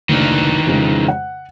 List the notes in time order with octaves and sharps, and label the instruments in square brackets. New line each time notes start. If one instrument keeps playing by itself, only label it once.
[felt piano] F#1 D2 D4 [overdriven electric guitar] D#3 E3
[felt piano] F2 C#3 G#3
F#5